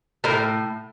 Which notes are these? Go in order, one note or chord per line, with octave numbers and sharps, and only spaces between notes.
A2 A#4